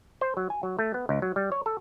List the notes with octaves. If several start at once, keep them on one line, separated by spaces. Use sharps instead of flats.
C5
F#3
G#5
F#3
A3
B3
C#2
F#3
G3
C#5
A4